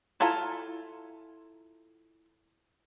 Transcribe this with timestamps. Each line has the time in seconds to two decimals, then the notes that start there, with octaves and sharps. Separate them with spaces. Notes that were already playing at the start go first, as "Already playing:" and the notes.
0.20 E4 F4 A4 G#5 A#5